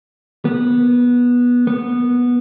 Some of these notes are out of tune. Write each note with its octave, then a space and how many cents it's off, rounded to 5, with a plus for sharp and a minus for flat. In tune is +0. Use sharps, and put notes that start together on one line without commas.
B3 -15
B3 -10